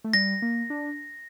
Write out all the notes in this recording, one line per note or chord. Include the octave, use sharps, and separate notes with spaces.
A3
G3 A#6
A#3
D4